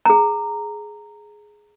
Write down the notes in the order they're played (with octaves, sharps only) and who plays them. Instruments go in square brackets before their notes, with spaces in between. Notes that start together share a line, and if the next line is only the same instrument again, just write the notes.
[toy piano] G#4 A#5